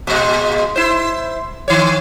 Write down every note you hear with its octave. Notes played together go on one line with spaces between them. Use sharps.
A#2 G#3
E4 C5
D#3 C#5